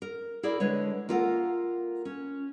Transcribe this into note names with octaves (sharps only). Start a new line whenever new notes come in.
A#4
E4 G#4 A#4 D5
D3 G#3 B4 C#5
A#3 E4 F4 A4 A#4 F#5
C#4